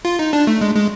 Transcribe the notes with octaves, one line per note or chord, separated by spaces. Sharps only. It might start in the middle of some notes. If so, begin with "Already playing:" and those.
F4
D#4
D4
A3
G#3
G#3